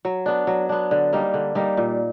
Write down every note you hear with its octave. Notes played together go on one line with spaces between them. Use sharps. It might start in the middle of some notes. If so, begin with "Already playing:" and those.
F#3
B3 D4
F#3
B3 D4
D3
G3 A#3 D#4
D3
G3 A#3 D#4
A#2